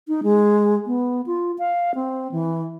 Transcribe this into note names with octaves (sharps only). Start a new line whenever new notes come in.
D#4
G#3
B3
F4
F5
C4
E3